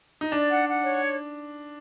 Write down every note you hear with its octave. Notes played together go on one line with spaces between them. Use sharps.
D#4
D4 D5
F#5
F#5
C#5